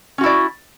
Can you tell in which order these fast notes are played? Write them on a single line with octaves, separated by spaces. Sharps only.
C#4 F#4 E4 D5